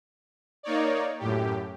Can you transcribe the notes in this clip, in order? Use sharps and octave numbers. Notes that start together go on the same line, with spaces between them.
A#3 D#4 C#5 D5
F#2 A2 G4